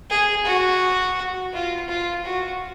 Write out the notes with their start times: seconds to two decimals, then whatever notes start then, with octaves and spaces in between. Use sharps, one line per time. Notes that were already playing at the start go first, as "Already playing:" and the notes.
0.10 G#4
0.45 F#4
1.53 F4
1.89 F4
2.25 F#4